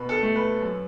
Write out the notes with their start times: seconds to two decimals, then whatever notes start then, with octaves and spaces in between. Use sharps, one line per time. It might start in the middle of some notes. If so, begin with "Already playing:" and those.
Already playing: B2 B4
0.09 A4
0.22 A3
0.36 B4
0.61 F#2